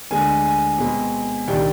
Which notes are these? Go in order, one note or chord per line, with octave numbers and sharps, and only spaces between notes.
D2 D3 G#3 G#5
G#5
B2 G#3 C4
C2 C3 D#3 G3 D4 G5